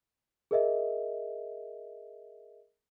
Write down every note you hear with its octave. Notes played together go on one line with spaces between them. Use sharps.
G#4 A#4 D#5 E5